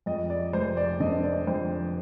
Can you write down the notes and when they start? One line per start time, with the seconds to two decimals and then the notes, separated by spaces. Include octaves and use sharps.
0.06 F2 D#5
0.30 D5
0.53 F1 C5
0.77 D5
1.00 D3 D#5
1.24 D5
1.47 F2 C5